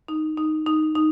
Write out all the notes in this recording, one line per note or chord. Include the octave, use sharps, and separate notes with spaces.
D#4
D#4
D#4
D#4